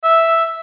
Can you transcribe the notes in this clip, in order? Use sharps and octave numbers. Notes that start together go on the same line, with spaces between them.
E5